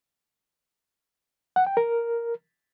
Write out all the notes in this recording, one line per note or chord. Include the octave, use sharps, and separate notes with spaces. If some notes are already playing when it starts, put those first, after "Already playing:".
F#5
G5
A#4